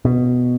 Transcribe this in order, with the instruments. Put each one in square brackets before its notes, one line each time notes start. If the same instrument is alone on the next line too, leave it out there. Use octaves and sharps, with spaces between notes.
[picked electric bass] B2